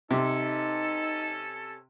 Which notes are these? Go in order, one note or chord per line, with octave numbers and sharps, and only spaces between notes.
C3 C#4 D#4 A4